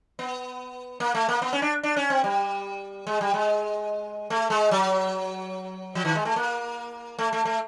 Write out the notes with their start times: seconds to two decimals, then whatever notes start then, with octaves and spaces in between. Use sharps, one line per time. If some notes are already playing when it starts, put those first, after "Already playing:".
0.19 B3
1.00 A#3
1.15 A3
1.29 A#3
1.42 B3
1.53 C#4
1.62 D4
1.83 D4
1.97 C#4
2.10 C4
2.24 G3
3.07 G#3
3.21 G3
3.34 G#3
4.30 A3
4.50 G#3
4.71 F#3
5.95 F3
6.05 D#3
6.15 G#3
6.25 A3
6.36 A#3
7.19 A3
7.33 A3
7.45 A3